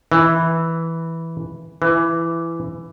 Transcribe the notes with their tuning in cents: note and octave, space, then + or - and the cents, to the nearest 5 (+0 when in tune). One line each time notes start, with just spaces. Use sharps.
E3 -5
E3 +15